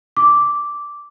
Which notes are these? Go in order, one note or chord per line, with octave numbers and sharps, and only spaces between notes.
D6